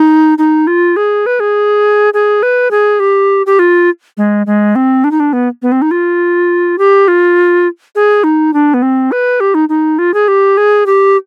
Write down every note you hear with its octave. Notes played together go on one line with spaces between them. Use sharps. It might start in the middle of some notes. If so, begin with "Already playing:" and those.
Already playing: D#4
D#4
F4
G#4
B4
G#4
G#4
B4
G#4
G4
G4
F4
G#3
G#3
C4
D4
D#4
D4
B3
B3
C4
D#4
F4
G4
F4
G#4
D#4
D4
B3
C4
B4
G4
D#4
D#4
F4
G#4
G4
G#4
G4